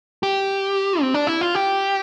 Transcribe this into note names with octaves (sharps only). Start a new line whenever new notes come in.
G4
C4
D4
E4
F4
G4